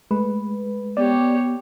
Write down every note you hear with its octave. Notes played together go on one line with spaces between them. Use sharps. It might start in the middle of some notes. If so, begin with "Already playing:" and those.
G#3 A3 B4
B3 G4 C#5 D5